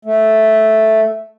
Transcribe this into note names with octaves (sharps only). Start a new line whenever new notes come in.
A3